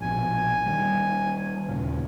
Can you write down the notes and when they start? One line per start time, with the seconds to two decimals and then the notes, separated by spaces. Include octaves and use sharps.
0.01 A#1 B2 G#5
0.66 D#3 G3
1.69 D#2 A#2 C#3